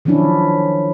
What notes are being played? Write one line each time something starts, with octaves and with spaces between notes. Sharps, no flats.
D#3 F3 F#3 C#4 D4 E4